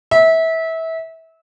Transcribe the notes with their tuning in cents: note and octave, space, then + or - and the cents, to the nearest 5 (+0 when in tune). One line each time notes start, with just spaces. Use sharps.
E5 -25